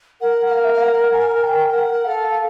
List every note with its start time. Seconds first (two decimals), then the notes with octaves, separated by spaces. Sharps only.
0.20 A#4 F#5
0.46 F#5
0.51 F5
0.64 E5
0.73 F5
0.82 F#5
1.13 G#5
1.43 G5
1.68 G5
1.74 F#5
2.05 A4 F5